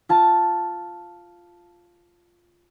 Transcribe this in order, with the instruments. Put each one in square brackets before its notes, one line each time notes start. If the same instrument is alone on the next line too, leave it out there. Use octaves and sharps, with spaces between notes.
[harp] F4 A5